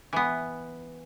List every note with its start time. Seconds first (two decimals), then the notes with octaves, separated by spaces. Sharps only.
0.13 E3 B3